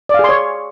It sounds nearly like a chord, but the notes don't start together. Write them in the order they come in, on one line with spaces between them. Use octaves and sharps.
D5 F5 G#4 C6 C#5